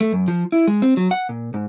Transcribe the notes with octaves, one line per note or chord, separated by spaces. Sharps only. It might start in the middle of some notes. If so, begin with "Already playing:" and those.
A3
F#2
F3
E4
G#3
C4
F#3
F#5
A#2
G#2